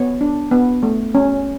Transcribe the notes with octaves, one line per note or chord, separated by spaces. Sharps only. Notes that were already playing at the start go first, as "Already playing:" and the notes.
Already playing: B3 C#5
D4
B3
A3
C#4